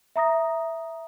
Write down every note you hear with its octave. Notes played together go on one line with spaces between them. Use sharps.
E5 A#5 D#6 A#6